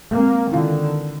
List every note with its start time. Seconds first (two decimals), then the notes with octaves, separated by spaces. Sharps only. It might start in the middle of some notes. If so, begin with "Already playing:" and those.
0.12 G#3 A#3 C4
0.52 D3 D#3 E4 F4 F5